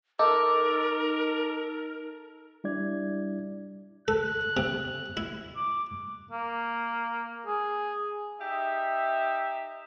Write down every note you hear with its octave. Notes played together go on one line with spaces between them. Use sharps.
D#4 A4 A#4 D6
G3 D4 E4 D5 G#6
A4 F#6
C3
E4
D6
A#3
G#4
D#4 G4 E5